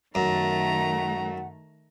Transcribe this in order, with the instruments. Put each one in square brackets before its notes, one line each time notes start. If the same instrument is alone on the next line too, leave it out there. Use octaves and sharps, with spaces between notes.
[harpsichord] F#2 [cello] D#3 A3 [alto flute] F#5 [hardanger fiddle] A#5